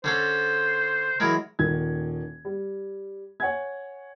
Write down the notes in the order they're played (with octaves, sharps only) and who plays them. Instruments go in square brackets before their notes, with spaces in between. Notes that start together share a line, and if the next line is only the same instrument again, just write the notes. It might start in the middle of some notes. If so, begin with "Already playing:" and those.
[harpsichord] D3 C#4 A4 [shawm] C5
[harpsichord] E3 F#3 G#3 [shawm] A#4
[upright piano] D#1 D#3 G#6
G3
C#5 F#5 G#5 G#6